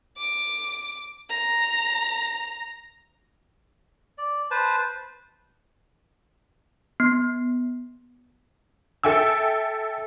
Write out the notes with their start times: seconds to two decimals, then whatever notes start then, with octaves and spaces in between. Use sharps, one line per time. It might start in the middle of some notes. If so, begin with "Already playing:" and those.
0.18 D6
1.30 A#5
4.18 D5
4.51 B4 C5 A5
7.00 B3
9.03 A4 E5 G5 G#5 E6